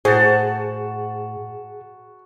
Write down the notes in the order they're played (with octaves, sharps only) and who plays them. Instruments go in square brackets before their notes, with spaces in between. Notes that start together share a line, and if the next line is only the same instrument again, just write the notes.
[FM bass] A2 [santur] F#4 F#5 A5 [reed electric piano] G#4 [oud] C5